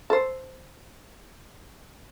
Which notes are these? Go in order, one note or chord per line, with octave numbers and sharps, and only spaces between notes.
A4 C5